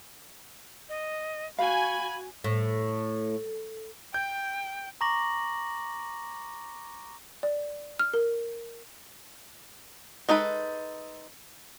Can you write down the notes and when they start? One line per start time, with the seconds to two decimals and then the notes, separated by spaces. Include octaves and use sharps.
0.89 D#5
1.58 F#4 F5 G#5 B5
2.44 A2
4.14 G5 G6
5.01 A#5 C#6 D6 A#6 F#7
7.43 D5
7.99 F6
8.14 A#4
10.29 G#3 D#4 A4 B4